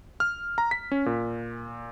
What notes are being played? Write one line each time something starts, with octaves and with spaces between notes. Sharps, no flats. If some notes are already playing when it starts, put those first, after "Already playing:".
F6
A#5
B6
C#4
A#2